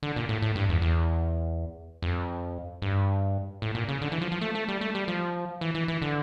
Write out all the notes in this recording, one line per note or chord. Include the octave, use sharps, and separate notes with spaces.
D3
A#2
A2
A2
G2
E2
E2
F2
G2
A2
A#2
C#3
D3
E3
F3
F3
A3
A3
G3
A3
G3
F3
E3
E3
E3
D3